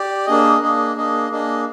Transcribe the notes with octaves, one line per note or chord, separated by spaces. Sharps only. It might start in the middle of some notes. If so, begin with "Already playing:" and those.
Already playing: G4 D5
A#3 D4 G#4 D#5
A#3 D4 G#4 D#5
A#3 D4 G#4 D#5
A#3 D4 G#4 D#5